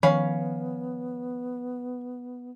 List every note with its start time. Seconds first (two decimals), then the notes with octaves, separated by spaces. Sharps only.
0.03 D#3 F3 B3 C#4 C#5 F5 B5